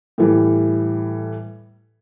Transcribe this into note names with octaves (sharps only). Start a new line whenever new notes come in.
A2 E3 G3